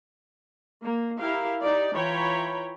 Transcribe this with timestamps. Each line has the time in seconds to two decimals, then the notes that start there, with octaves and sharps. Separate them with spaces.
0.83 A#3
1.18 E4 G4 A#4 F5
1.61 D#4 G4 D5
1.94 E3 F4 C#5 G5 A#5 B5